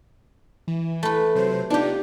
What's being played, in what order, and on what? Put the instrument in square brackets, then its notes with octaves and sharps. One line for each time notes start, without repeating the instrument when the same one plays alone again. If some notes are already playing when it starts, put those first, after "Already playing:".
[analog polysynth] E3
[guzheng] A3 B4
[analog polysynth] C3 F#3 C5
[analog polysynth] B3 D#4 F4 [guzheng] D4 G4